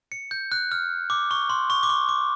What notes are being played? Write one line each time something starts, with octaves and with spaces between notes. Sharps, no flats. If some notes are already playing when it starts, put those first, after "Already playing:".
C#7
G6
F#6
F6
D6
C#6
C6
C#6
D6
C#6
D6